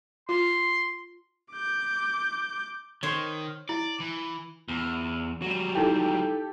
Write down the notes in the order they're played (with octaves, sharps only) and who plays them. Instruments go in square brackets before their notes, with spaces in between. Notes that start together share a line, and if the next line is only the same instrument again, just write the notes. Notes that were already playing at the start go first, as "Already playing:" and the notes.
[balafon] F4 [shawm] C6
[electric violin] D6 G6
[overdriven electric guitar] D#3 [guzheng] C5 C#5
[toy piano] E4 [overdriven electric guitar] D5
[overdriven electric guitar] E3
E2
F#3 G3
[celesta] D#4 E4 G5 [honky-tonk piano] G4 A4